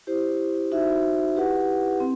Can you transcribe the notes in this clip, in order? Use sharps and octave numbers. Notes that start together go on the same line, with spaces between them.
E4 G4 C5
D#4 F#4 C5 E5
E4 G4 B4 F#5
C4